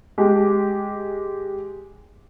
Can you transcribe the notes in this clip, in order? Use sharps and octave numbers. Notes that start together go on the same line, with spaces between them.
G#3 G4